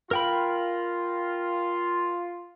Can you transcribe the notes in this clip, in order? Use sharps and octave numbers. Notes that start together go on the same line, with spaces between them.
F4 A#4 G5 B5